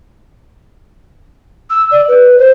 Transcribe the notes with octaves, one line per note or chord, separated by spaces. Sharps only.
E6
D5
B4
C5